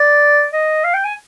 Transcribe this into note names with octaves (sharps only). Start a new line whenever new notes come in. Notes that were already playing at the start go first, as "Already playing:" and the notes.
Already playing: D5
D#5
F5
G5
G#5